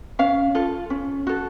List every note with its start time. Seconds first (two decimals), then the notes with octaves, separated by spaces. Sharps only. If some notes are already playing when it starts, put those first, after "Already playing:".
0.19 C#4 F5
0.55 F4 A4
0.90 C#4
1.27 F#4 A4